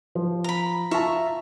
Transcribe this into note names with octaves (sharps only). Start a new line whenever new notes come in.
F3
A#5 B5
F4 E5 A5 A#5 C#6